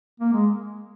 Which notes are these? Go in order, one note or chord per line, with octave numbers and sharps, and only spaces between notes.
A#3
G#3